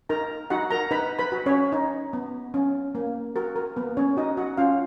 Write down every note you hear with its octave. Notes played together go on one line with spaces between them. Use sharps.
D#4 A#4 A#5
D#4 F#4 F#5
A#4 A#5
D#4 B4 B5
B4 B5
F#4
C#4 C#5
D#4
B3
C#4
A#3
F#4 A#4
A#4
A#3 B3 B4
C#4 C#5
D#4 F#4 D#5
F#4 F#5
C#4 F4 F5